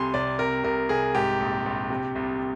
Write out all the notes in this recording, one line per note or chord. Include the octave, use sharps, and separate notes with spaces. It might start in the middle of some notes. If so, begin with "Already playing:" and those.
Already playing: C2 C3 G#5 C6
C2 D5
C3 A#4
C2 A#4
C2 G#4
G#2 G4
A#1
A#1
C3
C2